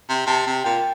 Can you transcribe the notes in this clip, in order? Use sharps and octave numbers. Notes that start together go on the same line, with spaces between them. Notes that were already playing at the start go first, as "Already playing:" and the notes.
C3
C3 A5
C3
A#2 G5